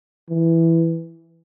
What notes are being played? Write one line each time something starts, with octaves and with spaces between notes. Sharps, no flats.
E3